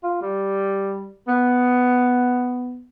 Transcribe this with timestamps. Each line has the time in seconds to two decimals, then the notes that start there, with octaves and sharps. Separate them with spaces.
0.03 F4
0.21 G3
1.28 B3